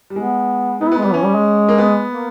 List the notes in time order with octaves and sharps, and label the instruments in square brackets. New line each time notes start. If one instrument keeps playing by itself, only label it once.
[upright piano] G3
[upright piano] G#3 [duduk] B3
[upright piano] B3 [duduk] D#4
[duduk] E4
[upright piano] B3
[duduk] G#3
[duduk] G3 [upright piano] B3
[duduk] E3 [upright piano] C#4
[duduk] G3
G#3
[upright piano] A#3
B3
[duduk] A#3